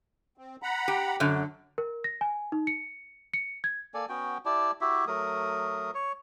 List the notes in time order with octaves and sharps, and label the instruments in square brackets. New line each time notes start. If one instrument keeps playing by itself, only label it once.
[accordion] C4
F#5 A#5 B5
[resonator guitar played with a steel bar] G4
[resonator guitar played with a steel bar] F#2 D3 [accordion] F#3
[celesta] A#4
A#6
G#5
D#4
C#7
C#7
G#6
[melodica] A#3 A4 D5 G#5
B3 C#4 F#4 G5
E4 G4 D5 A5
E4 F#4 G4 E5
F#3 A3 A#4 D#6
C#5